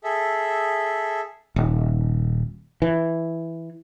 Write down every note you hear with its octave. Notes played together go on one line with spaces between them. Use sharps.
G#4 A4 E5
D#1
E3